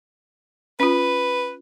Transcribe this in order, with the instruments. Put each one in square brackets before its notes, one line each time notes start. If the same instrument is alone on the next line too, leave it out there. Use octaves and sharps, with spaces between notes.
[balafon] C#4 F4 [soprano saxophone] B4